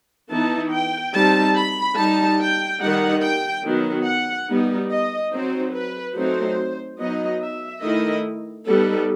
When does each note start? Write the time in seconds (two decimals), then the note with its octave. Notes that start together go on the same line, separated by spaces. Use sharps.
0.30 E3 B3 D#4 A5
0.72 G5
1.14 G3 C4 D#4 A5
1.56 B5
1.97 G3 D#4 A5
2.39 G5
2.81 D#3 G3 D#4 F#5
3.23 G5
3.64 D#3 F#3 B3
4.06 F#5
4.49 G3 B3 D#4
4.91 D#5
5.32 F#3 C4 D#4 C5
5.74 B4
6.16 F#3 A3 C4 D#4 C5
6.99 F#3 B3 D#4 D#5
7.42 E5
7.83 D#3 A3 E4 D#5
8.67 G3 B3 D#4 A4